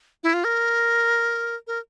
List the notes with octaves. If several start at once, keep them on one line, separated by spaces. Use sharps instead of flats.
E4
F4
A#4
A#4